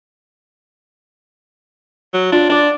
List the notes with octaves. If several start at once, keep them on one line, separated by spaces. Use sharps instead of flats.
F#3
D4 F4
D4 D5 F#5